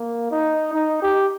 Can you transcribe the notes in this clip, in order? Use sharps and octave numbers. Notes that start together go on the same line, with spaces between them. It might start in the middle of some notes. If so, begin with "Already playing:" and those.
Already playing: A#3
D#4
D#4
G4